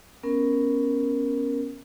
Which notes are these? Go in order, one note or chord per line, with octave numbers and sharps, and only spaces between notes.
B3 C#4 A#4